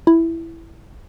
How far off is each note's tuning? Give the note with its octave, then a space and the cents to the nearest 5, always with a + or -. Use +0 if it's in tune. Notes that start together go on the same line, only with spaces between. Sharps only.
E4 +5